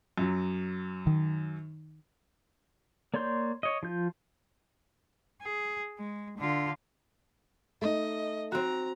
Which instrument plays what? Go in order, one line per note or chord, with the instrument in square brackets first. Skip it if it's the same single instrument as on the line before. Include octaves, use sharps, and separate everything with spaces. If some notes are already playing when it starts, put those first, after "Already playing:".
[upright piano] F#2 F#3
[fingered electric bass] D#3
[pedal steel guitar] A#3 C#5 D5 C6 G6
C#5 D#5
F3 F4 G6
[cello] G#4
G#3
D3 F4
[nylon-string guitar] A3 D#4 [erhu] D#5
[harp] C4 F#4 [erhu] A#5